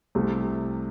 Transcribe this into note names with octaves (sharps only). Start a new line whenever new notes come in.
C2 C3 A3